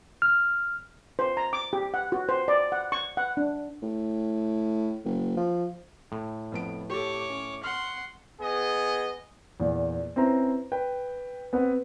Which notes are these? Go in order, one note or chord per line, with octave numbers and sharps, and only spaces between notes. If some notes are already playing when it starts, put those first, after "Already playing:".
F6
C5
A#5
D6
G4
F#5
F#4
C5
D5
F#5
C#6
F#5
D4
A2
F#1
F3
A2
F2 B3 D7
G4 A4 C#5 D6
C#4
F#5 C6 F6
B3 G#4 D#5
E2 A#2
C4 C#4 E4 B4 C5 A#5
B4 G5
B3 C4 B4 F#5